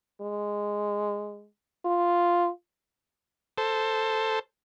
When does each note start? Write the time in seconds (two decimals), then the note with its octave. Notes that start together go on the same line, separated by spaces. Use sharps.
0.21 G#3
1.85 F4
3.58 A4 C5